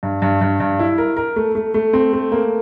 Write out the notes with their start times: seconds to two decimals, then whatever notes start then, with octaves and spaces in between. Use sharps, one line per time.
0.03 G2
0.22 G2
0.41 G2
0.60 G2
0.79 E4
0.98 A#4
1.17 A#4
1.36 A3
1.55 A3
1.74 A3
1.93 C4
2.13 A3
2.32 A#3